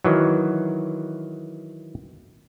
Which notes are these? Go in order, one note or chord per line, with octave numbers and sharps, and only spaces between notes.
D#3 E3 F#3